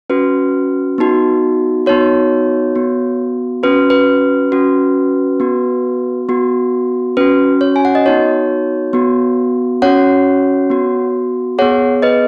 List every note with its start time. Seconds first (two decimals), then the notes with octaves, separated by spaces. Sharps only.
0.10 C#4 F#4 B4
0.98 B3 D#4 F#4
1.86 B3 D#4 F#4 C#5
2.75 B3 F#4
3.63 C#4 F#4 B4
3.90 B4
4.52 C#4 F#4
5.40 B3 F#4
6.29 B3 F#4
7.17 C#4 F#4 B4
7.61 C#5
7.76 G#5
7.85 F#5
7.95 D#5
8.05 B3 D#4 F#4 C#5
8.93 B3 F#4
9.82 C#4 F#4 C#5 F#5
10.70 B3 F#4
11.58 B3 G#4 C#5 F#5
12.02 B4 D#5